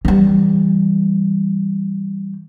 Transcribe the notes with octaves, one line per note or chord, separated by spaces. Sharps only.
E3 G3